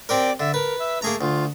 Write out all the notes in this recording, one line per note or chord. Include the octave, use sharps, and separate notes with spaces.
C4 G4 A#4 D5
D3 E5
A#4 B4
E5
A3 A#3 G#4 A#5
D2 F4